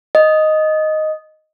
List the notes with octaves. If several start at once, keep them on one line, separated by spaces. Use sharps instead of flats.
D#5